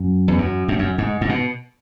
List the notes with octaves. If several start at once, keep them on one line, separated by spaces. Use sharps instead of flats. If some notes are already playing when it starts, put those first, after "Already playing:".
Already playing: F#2
E2
F#2
F#2
F#2
G#2
G#2
B2